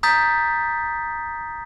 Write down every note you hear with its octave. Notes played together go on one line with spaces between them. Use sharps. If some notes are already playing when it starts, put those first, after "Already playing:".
A#5 D#6 G6 A6 B6